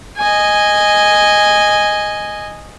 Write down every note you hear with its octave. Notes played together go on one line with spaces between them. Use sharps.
D#5 G#5